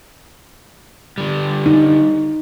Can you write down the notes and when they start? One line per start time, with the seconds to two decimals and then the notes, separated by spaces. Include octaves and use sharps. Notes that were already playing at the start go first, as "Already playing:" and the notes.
1.18 D3 G3
1.66 D#4